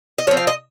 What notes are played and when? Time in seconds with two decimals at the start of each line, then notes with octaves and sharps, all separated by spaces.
0.18 D#5
0.27 F3 C#5
0.31 C4
0.37 F5
0.47 D#5